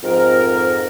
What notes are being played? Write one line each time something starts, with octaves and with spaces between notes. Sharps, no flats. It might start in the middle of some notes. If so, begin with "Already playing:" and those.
F2 G#2 A#4